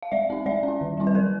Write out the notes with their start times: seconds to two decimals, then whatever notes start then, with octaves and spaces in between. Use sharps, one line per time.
0.02 F5
0.12 G#3 D5 E5
0.30 C4 D#4
0.46 G#3 D5 E5
0.63 C#4
0.68 E4
0.81 D#3
0.97 G3 C4 E4
1.07 B4
1.15 F#3 A#4 C5